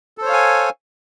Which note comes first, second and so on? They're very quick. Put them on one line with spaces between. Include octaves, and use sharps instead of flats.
A4 C5 C#5 F5 G#5